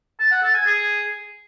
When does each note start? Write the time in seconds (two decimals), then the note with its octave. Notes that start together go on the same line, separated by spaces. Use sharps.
0.19 A5
0.31 F#5
0.43 A4
0.54 G#5
0.66 G#4